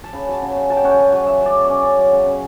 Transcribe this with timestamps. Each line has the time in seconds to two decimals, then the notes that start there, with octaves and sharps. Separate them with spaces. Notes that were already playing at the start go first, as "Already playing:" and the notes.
0.04 A5
0.13 C#3 B5
0.27 F#3 A5
0.42 C#3
0.51 A5
0.56 C#3
0.70 F#3 A5
0.77 G5
0.84 C#4 F#5
0.91 G5
0.98 F#3
1.12 F#3
1.26 C#3 E5
1.41 F#3 D5
1.55 C#3
1.65 D5
1.70 C#4
1.84 C#4
1.98 F#3
2.13 C#3
2.26 C#3